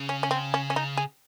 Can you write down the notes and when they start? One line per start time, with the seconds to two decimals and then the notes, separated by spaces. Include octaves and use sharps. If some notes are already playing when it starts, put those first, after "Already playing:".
Already playing: C#3
0.09 C#4
0.23 C#4
0.31 C4
0.54 C#4
0.70 C#4
0.76 D#4
0.97 G#4